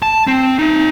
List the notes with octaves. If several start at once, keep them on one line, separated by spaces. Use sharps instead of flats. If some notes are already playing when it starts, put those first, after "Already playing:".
A5
C4
D#4 E5